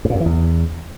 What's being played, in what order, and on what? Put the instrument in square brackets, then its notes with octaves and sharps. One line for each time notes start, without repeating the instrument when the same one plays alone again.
[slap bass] G2
A#2
F#2
E3
E2